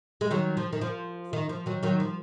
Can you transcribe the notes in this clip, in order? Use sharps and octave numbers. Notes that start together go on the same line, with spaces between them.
G#3
D#3 F#3
F3
D#3
F3
D#3
F3
D#3 F#3
D#3 F#3
F3